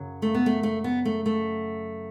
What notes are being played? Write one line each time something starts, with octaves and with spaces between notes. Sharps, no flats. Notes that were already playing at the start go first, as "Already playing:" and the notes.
Already playing: F#2 C#3 F#3
A3
B3
A3
A3
B3
A3
A3